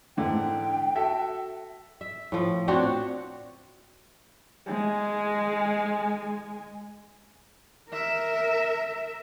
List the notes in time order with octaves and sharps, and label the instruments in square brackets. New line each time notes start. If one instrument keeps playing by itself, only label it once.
[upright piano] G#2 D3 E3 [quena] G5
[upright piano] F#4 A4 E5
[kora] E5
A2 F3
C4 D4 F#4 C#5
[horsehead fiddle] G#3 G#5
A#4 E5